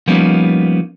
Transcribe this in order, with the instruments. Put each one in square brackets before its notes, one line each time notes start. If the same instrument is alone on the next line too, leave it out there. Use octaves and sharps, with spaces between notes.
[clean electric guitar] F3 G3 A#3 B3 C#4 D#4